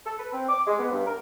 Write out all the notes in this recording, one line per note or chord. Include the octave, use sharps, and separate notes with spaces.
A4
B4
C4
D6
G#3
B3
G2
A#4